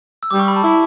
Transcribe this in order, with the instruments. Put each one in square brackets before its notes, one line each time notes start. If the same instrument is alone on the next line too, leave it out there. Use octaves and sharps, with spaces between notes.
[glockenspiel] E6
[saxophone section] G3 [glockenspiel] D6
[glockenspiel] C#6
B5
A5
[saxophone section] E4